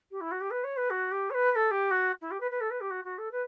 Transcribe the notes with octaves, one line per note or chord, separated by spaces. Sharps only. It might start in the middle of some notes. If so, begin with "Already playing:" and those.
G4
E4
F#4
G4
B4
C#5
B4
F#4
G4
C#5
B4
B4
A4
G4
F#4
E4
G4
B4
B4
A4
B4
G4
F#4
F#4
A4
B4